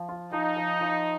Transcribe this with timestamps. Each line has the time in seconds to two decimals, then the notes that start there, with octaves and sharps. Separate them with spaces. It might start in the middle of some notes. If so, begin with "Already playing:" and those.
Already playing: F3
0.09 F4
0.32 F3 D#4
0.57 F3
0.81 F3